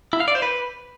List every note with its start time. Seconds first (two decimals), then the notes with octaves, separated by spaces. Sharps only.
0.13 E4
0.20 F5
0.28 D5
0.35 C5
0.42 B4